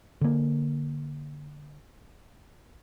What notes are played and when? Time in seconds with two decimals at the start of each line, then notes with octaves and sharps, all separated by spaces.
0.21 D3 A#3